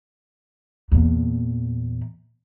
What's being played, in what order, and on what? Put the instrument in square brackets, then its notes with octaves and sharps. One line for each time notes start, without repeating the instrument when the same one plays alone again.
[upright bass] E2 A#2